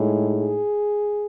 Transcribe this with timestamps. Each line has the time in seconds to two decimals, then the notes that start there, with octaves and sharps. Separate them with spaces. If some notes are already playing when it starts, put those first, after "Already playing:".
Already playing: A2 G#3 D#4
0.29 G#4